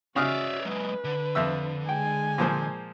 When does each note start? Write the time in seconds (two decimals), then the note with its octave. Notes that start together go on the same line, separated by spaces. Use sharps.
0.16 C#3 F#4 C#5 D5 E5 D#6 F6
0.65 F#3 G#3 B4
1.04 D3
1.35 F2 E5 E6
1.89 G#3 G5 G#5
2.38 A#2 F3 C5